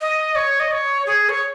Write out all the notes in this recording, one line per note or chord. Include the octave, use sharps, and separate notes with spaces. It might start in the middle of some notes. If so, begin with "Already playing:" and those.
D#5
C#5
D#5
C#5
G#4
C#5